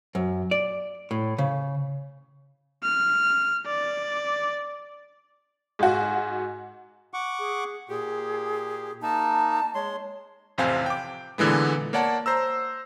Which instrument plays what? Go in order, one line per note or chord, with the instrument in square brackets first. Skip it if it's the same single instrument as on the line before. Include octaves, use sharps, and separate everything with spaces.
[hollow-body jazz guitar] F#2
D5
A2
C#3
[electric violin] F6
D5
[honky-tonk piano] G#2 F#4
[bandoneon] F#5 C#6 D6
[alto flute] G#4
[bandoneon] A#2 G4 [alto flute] G#4
[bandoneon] A#3 D#4 [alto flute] A5
[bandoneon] G#3 C6 [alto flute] C#5
[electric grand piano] A1 F2 C3 C4 F5 G#5
G5 D6
A#2 D3 E3 G#3 B3
A#3 C#5 D5 F#5 A5
C5 A#5 E6